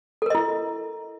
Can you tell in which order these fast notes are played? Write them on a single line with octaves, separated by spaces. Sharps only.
A4 A#4 D#5 E4